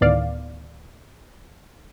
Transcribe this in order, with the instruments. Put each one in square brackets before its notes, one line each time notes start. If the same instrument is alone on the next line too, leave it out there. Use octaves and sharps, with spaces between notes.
[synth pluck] D2 A2 D#3 B3 D5 F5